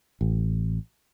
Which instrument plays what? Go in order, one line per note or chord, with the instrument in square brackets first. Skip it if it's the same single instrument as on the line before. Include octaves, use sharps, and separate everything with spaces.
[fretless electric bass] A1